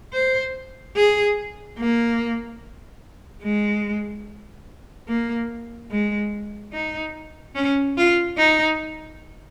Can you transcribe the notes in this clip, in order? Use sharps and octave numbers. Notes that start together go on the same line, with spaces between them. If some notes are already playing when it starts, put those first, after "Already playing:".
C5
G#4
A#3
G#3
A#3
G#3
D#4
C#4
F4
D#4